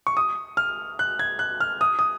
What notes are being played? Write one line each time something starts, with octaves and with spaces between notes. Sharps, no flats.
C#6
D#6
F6
F#6
G#6
F#6
F6
D#6
D#6